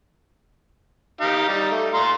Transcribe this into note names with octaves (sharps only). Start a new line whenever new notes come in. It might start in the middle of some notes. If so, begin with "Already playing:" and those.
D#4 G4 F5
G3 D#4
A3
F5 A#5 C6